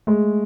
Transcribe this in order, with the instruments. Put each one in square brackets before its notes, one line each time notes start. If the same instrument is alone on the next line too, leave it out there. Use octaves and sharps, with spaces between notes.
[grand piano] G#3 [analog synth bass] A3